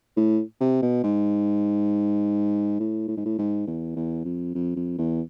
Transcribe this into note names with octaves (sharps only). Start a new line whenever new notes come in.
A2
C3
B2
G#2
A2
A2
G#2
A2
G#2
E2
E2
F2
F2
F2
E2